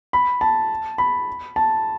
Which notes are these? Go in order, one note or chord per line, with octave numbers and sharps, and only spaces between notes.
B5
A5
B5
A5